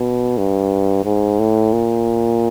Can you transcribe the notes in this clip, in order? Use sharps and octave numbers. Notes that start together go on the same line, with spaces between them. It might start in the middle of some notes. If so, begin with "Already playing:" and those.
Already playing: B2
G2
G#2
A2
A#2